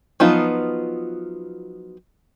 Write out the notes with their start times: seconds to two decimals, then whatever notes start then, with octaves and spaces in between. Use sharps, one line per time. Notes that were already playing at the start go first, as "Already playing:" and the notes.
0.20 F3 F#3 B3 D#4 F4